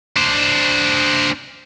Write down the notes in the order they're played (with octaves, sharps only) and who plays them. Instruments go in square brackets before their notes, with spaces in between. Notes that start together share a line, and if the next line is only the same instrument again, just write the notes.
[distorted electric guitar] D4 C5